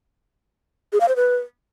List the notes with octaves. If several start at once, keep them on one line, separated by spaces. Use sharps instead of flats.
G#4
F5
C5
B4